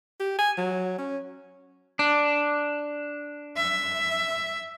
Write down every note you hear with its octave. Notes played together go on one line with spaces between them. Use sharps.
G4
G#5
F#3
C#4
D4
E5